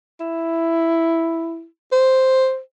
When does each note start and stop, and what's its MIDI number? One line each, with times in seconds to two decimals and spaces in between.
0.20 1.66 64
1.92 2.60 72